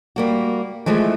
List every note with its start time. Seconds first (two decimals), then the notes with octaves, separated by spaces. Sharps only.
0.16 G3 A#3 F#4
0.86 E3 F3 G#3 A3